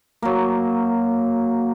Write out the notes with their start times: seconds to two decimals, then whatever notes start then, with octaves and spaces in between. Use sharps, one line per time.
0.22 F#3 A#3